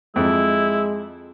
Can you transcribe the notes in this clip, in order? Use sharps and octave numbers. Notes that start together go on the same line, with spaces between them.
F2 G#3 E4